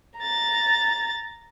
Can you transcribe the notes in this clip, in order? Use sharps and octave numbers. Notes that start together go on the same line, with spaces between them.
A#5 A6